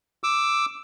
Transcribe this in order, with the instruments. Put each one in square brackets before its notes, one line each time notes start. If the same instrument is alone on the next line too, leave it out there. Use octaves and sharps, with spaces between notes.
[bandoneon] D6 E6